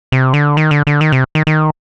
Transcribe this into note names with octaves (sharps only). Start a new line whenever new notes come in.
C3
D3
D#3
D3
D3
D#3
C3
D#3
D#3